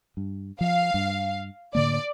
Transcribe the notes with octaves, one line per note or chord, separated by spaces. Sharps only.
G2
F3 F5
G2
A2 D3 A#3 D5